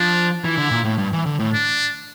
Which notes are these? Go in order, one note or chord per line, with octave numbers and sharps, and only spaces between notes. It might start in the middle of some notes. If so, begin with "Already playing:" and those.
Already playing: F3 D4
E3 E4
D3
A#2
A2
G2
E3
D3
A2
D4